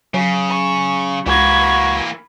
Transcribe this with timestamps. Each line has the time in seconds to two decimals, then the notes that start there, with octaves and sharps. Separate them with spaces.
0.14 C#3 F#3
0.50 C#6
1.26 C#2 E3 A#3 F#4 B5 G#6